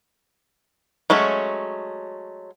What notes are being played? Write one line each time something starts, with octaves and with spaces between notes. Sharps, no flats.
F#3 G#3 A3 C#4